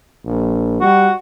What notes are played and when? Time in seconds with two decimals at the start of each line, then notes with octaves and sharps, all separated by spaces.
0.25 A#1
0.81 G3 F#4